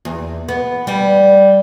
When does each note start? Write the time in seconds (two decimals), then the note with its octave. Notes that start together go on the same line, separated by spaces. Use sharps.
0.05 E2
0.48 B3
0.87 G3